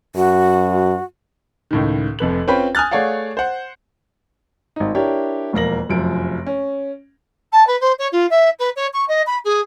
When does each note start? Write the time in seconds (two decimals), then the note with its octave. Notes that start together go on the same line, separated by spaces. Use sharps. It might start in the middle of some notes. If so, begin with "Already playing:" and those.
0.15 F#2 F#4
1.71 C#2 A2 D#3
2.19 F1 F2 B4 F#7
2.48 C4 C#4 F4 B4 G5 B5
2.75 G#5 D#6 F6 F#6 A6
2.91 A3 G#4 C#5 D5 F5 F#5
3.37 C5 F#5
4.76 G#1 D#4
4.95 D4 E4 G4 A#4 C#5 D5
5.53 E1 F2 A#3 A#6 F#7
5.89 F1 F#2 F3 D7
6.46 C#4
7.52 A5
7.67 B4
7.80 C5
7.98 C#5
8.12 F4
8.30 E5
8.59 B4
8.76 C#5
8.93 C#6
9.08 D#5
9.26 B5
9.44 G#4